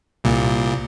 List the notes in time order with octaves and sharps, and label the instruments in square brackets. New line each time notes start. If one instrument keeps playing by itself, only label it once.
[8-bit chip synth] C2 A#2